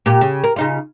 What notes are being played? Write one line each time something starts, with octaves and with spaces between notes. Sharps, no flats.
A#2 G4
C#3
A#4
C#3 D#4 F4